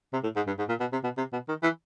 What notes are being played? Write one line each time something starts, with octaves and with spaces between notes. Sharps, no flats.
C3
A2
G#2
G2
G#2
A#2
B2
C3
B2
C3
B2
D#3
E3